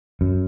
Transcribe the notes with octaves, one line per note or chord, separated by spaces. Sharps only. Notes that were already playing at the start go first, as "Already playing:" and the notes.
F#2